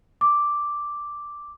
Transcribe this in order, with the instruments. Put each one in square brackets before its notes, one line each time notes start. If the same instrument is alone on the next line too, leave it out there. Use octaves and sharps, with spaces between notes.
[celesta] D6